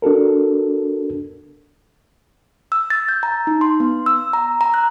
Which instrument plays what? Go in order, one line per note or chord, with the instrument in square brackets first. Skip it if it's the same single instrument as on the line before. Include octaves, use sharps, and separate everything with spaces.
[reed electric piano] D4 F#4 A4 A#4
[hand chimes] E6
A6
G6
A#5
D#4
C6
B3
E6
A#5
A#5
F#6